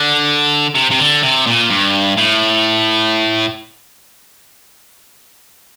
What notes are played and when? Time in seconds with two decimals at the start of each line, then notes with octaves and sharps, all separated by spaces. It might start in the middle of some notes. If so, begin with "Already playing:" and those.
Already playing: D3
0.75 C3
0.91 C3
0.99 D3
1.23 C3
1.47 A#2
1.70 G2
2.17 A2